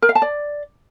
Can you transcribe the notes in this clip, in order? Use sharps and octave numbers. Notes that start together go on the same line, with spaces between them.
A#4
F5
A5
D5